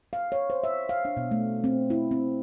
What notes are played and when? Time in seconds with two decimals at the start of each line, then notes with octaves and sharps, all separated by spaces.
0.13 F5
0.32 C#5
0.50 C5
0.64 E5
0.89 F5
1.05 D4
1.17 B2
1.31 A3
1.64 C4
1.90 E4
2.11 C4